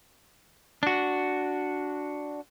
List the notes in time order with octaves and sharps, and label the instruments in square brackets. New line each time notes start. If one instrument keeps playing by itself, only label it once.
[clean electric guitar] D4 F#4